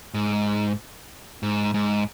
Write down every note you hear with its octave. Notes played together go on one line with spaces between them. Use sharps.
G#2
G#2
G#2